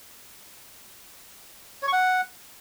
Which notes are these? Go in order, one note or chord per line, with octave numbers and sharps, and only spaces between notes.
C#5
C#6
F#5